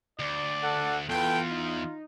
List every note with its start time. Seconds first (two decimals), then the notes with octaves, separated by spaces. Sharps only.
0.20 D2 D5
0.63 A4 F#5
1.09 E2 F4 A4 B4 G5
1.50 D#4